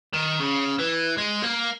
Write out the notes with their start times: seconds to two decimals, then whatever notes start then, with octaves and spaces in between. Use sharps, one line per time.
0.14 D#3
0.40 C#3
0.79 E3
1.18 G#3
1.43 A#3